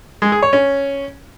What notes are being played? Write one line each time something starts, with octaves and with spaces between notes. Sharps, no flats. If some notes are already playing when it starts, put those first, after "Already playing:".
G#3
G#4
C#5
C#4